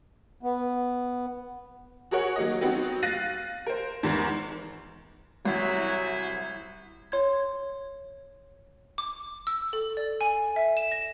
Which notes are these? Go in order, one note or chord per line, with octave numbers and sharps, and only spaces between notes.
B3
F#4 G#4 A#4 C#5 F#5
F#3 A#3 D#5
F#3 B3 C4 D#4 F#4
F5 F#6 A6 A#6 D#7
A#4 C5
G#1 E2 G#2
C2 E3 F#3 C5 G#5 B5
C#5 C6 G#6
D6
E6
A4
D5
G#5
E5
E7
A#6